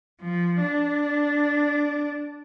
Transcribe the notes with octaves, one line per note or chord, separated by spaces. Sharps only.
F3
D4